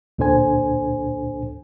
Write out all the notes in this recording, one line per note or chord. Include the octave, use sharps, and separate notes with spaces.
D2 A#2 D4 A4 C5 G#5